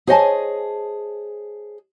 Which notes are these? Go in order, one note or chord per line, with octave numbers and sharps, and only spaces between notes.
G#4 C5 C#5 D#5 G#5 A5